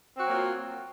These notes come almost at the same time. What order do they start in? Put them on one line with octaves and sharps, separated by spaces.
C4 F#4 F#3 A#3 F4